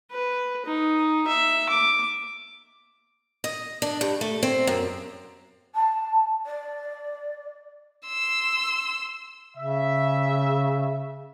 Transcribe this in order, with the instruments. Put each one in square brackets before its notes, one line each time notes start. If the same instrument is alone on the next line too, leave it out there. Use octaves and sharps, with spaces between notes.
[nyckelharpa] B4
D#4
E5
D6
[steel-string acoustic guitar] D#5
D4
G2
A3
C4
F#2
[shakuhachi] A5
D5
[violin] C6 E6
[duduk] C#3 [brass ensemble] E5